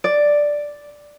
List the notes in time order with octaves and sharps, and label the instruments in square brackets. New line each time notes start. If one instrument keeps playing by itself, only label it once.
[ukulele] D5